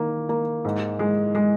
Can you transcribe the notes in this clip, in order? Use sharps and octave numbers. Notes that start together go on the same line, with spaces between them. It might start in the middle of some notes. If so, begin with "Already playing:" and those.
Already playing: D#3 A#3
A#3
G#2
G#3
G#3